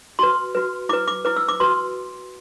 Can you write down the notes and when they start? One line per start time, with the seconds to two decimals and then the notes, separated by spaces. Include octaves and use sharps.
0.19 F#4 B4 C6
0.55 F#4 B4
0.89 E4 D6
0.93 B4
1.08 D6
1.25 E4 B4 D6
1.36 E6
1.49 D6
1.60 F#4 B4 C6